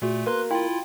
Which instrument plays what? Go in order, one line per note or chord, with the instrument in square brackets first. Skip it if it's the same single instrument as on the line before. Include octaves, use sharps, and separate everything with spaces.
[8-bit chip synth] A#2 A3 [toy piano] F#4 G#4
[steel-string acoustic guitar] A#3 [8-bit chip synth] B4 C6 F#6
[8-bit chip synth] E4 F4 [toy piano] F5 G5 C6